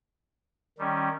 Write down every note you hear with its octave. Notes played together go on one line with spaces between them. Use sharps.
D#3 G3 C#4